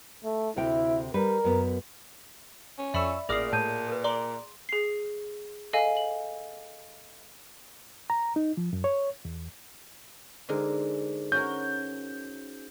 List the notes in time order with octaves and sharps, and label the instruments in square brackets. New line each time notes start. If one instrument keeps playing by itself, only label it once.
[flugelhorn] A3
[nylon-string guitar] D2 C3 G5 [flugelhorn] E4
[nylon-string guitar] G3 B4 [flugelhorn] A#4
[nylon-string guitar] F#2 B3
[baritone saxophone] C#4
[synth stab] F2 C#6 E6 [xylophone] D5 E5 B5
[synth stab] A1 D5 F6 [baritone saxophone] A#2 [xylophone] G#4 D#6 C7 [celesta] A#6
[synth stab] A2 [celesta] A5 G6 D#7
[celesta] A#4 B4
[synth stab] D5 [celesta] A#5 [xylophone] C6
[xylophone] G#4 C7
A4 D#5 F5 G#5
F#7
[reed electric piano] A#5
D#4
F3
F#2
C#5
E2
[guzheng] D3 G#3 A#4 [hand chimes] D#4 G#4 C5
[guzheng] C#4 F#4 A#4 [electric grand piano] G6